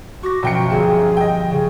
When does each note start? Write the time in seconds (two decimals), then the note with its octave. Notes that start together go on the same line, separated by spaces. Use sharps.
0.23 F#4 C#6 D6 A#6
0.43 F#2 B2 F3 G5 C#7
0.70 G1 C4 G#4
1.17 D#5 G5
1.51 C#3 G#4